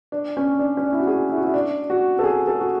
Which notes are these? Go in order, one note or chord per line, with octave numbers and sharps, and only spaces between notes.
D4
C#4
D4
C#4
D4
E4
F#4
G#4
E4
F#4
E4
D4
F#4
A4
G#4
A4
F#4